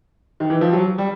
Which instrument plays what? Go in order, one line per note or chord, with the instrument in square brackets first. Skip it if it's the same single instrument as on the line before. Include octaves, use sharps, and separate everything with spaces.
[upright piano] D#3
E3
F3
F#3
G3